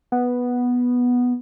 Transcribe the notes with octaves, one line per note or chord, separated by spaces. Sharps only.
B3